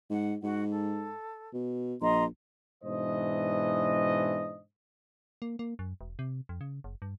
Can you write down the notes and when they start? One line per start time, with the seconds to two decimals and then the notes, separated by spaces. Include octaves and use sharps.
0.10 G#2 F#5
0.43 G#2 F#4 F#5
0.70 A4
1.53 B2
2.01 A#1 D#5 A#5 C6
2.83 G#2 B2 E3 D4 C5 D#5
5.42 A#3
5.59 A#3
5.79 F#2
6.01 E1
6.19 C3
6.49 F2
6.61 C#3
6.84 F#1
7.02 G2